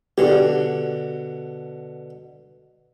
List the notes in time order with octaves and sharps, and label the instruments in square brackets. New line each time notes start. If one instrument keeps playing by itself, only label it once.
[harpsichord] B2 D3 [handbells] G4